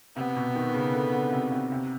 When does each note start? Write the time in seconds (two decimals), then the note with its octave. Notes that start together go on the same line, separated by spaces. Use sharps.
0.16 C3 B3
0.36 B2
0.55 D#3
0.74 C#3
0.93 D3
1.13 D3
1.33 C3
1.52 C3
1.72 C3